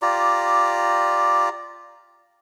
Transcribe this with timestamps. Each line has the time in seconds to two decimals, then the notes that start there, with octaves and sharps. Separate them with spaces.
0.02 F4 G4 D5 A#5